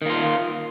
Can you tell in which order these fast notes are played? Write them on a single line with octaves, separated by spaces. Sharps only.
D#3 A#3 F4